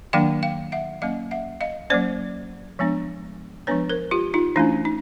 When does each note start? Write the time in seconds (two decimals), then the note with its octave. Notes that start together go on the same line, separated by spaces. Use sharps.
0.13 D#3 F#3 A#3 D4 F5 G5
0.43 F5 G5
0.72 E5 F#5
1.02 F#3 A#3 C#4 D#5 F5
1.31 E5 F#5
1.61 D#5 F5
1.90 F#3 A#3 C#4 C5 D5
2.79 F3 G#3 B3 D4
3.67 F3 G#3 B3 D4 B4 C#5
3.90 A#4 C5
4.11 F4 G4
4.34 D#4 F4
4.56 E3 A3 C#4 D4 E4
4.85 D#4